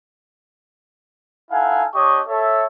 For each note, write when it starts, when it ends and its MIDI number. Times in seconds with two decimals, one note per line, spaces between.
1.51 1.84 63
1.51 1.84 64
1.51 1.84 69
1.51 1.84 77
1.51 1.84 78
1.51 1.84 80
1.95 2.22 62
1.95 2.22 67
1.95 2.22 73
1.95 2.22 75
1.95 2.22 85
1.95 2.22 87
2.28 2.64 69
2.28 2.64 73
2.28 2.64 76